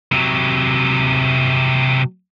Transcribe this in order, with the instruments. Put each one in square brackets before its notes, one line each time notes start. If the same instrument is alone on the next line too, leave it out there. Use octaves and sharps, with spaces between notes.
[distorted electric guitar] C3 F#3